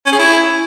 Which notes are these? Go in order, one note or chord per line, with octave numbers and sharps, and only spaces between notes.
C#4
G#4
E4